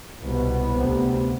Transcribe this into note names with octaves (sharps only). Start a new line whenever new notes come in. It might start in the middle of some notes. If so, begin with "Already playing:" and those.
C2 B2 B3
D2 C3